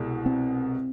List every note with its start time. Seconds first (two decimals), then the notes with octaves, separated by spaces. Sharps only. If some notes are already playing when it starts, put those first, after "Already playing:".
Already playing: C2 B2 G#3
0.26 C4